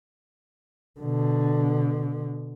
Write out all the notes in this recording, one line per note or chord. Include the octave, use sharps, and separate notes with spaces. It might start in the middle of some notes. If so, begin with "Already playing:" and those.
B2 D3